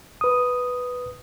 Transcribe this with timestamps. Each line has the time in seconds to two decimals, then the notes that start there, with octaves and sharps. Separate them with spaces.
0.21 B4 D#6